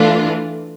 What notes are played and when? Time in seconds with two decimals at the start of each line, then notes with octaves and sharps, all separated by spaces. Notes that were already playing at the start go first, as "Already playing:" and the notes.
Already playing: E3 A3 D4 F4